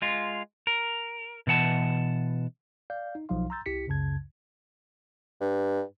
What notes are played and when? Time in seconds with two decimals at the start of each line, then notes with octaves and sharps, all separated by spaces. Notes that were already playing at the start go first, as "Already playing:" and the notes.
0.02 G#3 F4
0.67 A#4
1.47 B2 E3 F#5 A5
2.90 D5 F5 G6
3.15 D#4
3.29 B1 F3 F#3 D#4 F5 C6
3.50 A#5 C6 E6 G6 A6
3.66 C2 E4 G4 B6 C#7
3.87 C#2 F#2 C#3 A5 G#6
5.40 G2